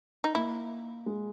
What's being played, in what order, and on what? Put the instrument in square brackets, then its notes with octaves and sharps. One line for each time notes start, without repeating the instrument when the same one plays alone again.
[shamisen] D#4
[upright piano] A#3 [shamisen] E4
[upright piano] G#3